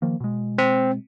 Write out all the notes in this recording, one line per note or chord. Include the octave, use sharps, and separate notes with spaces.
D#3 F3 A#3
B2 G#3
C4